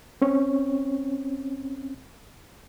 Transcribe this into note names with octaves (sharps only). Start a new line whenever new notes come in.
C4 C#4 C#5